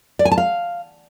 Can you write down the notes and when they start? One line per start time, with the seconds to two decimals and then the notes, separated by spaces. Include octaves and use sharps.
0.19 D5
0.25 G#5
0.32 A5
0.38 F5